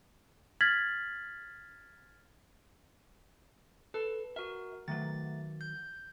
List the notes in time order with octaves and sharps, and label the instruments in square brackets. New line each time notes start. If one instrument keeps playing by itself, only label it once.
[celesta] F6 G#6 A6 B6 F#7
[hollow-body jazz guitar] A4 [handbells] B4
[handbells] F#4 A#4 [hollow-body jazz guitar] E5
[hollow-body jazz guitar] D#3 F#3 [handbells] A3 A6
[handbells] G6